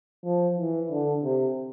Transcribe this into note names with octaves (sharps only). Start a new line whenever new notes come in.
F3
E3
D3
C3